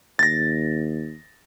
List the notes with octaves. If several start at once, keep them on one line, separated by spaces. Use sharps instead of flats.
D#2 A6 A#6